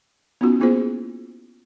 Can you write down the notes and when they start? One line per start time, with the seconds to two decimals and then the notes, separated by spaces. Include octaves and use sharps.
0.41 B3 C#4 D#4 F4 F#4
0.60 A#3 B3 E4 F4 G#4 C5